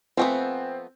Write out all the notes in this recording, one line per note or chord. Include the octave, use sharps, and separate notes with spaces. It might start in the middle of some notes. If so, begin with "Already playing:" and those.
F3 A3 B3 C4 B4 F#5 G#5